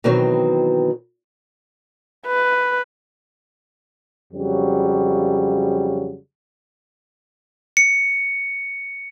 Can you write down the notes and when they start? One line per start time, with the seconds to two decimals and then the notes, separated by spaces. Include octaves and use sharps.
0.04 B2 D#3 E3 F#3 C4
2.27 B4
4.34 F2 C#3 F#3 G3
7.77 C#7